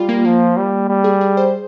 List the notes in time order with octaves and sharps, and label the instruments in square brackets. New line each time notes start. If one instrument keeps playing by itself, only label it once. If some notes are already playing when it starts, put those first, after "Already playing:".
Already playing: [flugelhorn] G3 [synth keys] F4
[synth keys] A#3
[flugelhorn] F3 [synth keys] A#3
[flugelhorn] G3
G3
[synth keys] G#4
G#4
C5